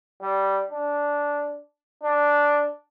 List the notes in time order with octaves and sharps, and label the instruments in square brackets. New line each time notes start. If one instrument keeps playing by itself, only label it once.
[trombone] G3
D4
D4